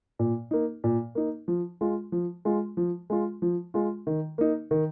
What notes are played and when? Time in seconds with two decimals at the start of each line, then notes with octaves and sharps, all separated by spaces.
0.19 A#2
0.51 A#3 D#4
0.84 A#2
1.15 A#3 D#4
1.48 F3
1.81 G#3 F4
2.12 F3
2.45 G#3 F4
2.77 F3
3.10 G#3 F4
3.42 F3
3.74 G#3 F4
4.07 D#3
4.38 A#3 D#4
4.71 D#3